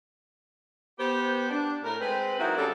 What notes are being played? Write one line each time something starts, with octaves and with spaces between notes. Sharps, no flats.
B3 G4 C5
D4
A2 A#4
G#3 C4 B4
F#3 A#3 C4 D#4 E4 F#4
C#3 F#3 G3 D4 A4